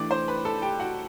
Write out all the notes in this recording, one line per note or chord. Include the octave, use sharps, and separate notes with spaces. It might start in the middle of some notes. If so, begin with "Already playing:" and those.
Already playing: E3 A3 D4 D5 D6
C5 C6
B4 B5
A4 A5
G4 G5
F#4 F#5